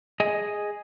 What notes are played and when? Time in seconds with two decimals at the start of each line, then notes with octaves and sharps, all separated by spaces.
0.20 G#4 D#5